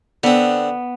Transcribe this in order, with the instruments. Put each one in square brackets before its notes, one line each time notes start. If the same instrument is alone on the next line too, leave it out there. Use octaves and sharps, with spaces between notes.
[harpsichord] D3 C4 [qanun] B3